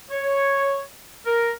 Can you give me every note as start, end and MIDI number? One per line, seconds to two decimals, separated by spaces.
0.11 0.81 73
1.26 1.52 70